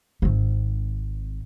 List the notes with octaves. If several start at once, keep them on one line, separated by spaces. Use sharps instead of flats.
G#1 C4